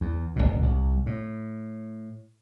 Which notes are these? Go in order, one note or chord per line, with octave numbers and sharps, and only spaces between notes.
E2
D1 G1 F#2 B2
C2
A2